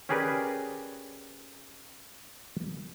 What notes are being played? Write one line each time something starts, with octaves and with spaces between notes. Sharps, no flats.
C#4 G4 G#4 A#4 B4 D5